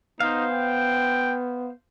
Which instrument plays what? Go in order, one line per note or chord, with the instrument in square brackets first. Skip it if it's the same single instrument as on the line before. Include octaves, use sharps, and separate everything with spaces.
[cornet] B3 [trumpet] D#4 [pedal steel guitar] C5 F5
[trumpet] G5